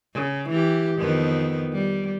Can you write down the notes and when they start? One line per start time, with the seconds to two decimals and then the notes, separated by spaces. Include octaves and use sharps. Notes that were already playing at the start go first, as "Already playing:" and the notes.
0.14 C#3
0.49 E3 G4
0.97 F2 D#3 B3
1.72 G3